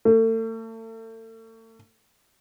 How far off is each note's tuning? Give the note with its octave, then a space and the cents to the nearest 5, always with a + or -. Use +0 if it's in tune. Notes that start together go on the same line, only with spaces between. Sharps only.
A3 +40